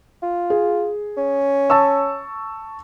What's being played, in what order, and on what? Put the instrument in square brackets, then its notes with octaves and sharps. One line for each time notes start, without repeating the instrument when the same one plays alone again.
[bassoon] F4
[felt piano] G#4
[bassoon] C#4
[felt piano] A5 C#6 E6